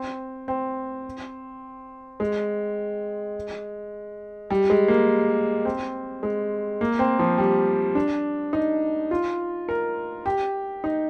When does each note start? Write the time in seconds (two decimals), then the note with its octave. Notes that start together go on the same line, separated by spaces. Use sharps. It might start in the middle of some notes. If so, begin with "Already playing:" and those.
Already playing: C4
0.48 C4
2.20 G#3
4.50 G3
4.70 G#3
4.88 A#3
5.65 C4
6.23 G#3
6.81 A#3
6.99 C4
7.19 F3
7.38 G3
7.95 D4
8.53 D#4
9.11 F4
9.69 A#4
10.26 G4
10.84 D#4